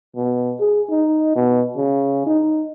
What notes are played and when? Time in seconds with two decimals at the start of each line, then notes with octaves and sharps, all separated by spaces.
0.16 B2
0.60 G#4
0.90 D#4
1.36 B2
1.77 C#3
2.26 D#4